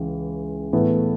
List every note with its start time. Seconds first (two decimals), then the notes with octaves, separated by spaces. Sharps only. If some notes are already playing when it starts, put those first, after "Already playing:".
Already playing: C#2 E3
0.73 A2 E3 A3 B3